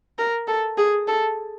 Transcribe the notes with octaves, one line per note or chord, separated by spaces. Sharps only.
A#4
A4
G#4
A4